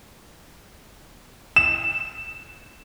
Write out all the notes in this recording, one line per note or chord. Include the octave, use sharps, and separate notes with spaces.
E7